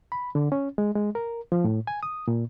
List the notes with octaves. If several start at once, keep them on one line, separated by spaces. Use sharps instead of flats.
B5
D3
C#4
G#3
G#3
A#4
F3
A2
G#5
D#6
A#2